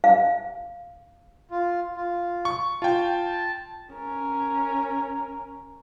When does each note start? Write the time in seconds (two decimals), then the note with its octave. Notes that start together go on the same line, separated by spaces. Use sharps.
0.04 F5
1.51 F4
1.96 F4
2.45 C#6
2.82 F4 G5 A5
3.94 C#4 A#4